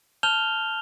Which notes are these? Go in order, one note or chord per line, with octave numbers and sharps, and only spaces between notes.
A5 F6 G6 F7 G7